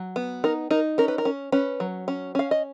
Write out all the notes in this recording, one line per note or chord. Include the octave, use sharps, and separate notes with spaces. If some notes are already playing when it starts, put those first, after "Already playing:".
Already playing: F#3
B3
D#4 A#4
D#4 A#4
C#4 A#4
B4
A#4
C#4
C#4 B4
F#3
C#4
C#4 F5
D#5